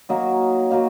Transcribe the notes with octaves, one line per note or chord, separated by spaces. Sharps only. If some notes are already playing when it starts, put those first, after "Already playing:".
F#3 A#3 D#4
F#3 A#3 D#4